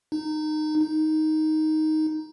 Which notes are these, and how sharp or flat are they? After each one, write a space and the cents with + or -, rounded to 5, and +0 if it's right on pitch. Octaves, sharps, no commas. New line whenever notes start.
D#4 -20
D#4 +5